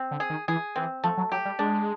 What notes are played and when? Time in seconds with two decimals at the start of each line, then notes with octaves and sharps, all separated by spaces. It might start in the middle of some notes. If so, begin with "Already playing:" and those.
Already playing: C4
0.11 D3
0.20 G#4
0.30 D#3
0.48 E3 G#4
0.76 E3 C4
1.04 F3 A3
1.17 F#3
1.31 F#3 G4
1.45 G3
1.59 G#3 D4